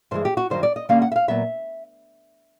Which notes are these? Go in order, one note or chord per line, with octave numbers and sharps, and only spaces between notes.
G2 E3 G#3 C5
G4
F#4
G2 D#3 F#3 C5
D5
D#5
D3 G3 A#3 C#4 F5
F#5
E5
F5
A#2 F#3 B3 E5